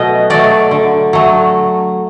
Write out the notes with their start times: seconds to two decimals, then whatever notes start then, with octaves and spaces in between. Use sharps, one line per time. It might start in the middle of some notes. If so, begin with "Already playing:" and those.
Already playing: B2 F#3 A3 D#5
0.30 F#3 A3 D5
0.71 D3
1.13 F#3 A3